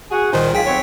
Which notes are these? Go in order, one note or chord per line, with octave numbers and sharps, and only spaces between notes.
F#4 G#4
C2 A#2 D#3 D#4 C5
B1 G#3 F4 G#4 G5 B6
B3 C4 C#5